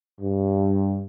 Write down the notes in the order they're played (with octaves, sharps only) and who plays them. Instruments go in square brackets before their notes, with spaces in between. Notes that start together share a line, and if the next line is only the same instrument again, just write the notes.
[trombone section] G2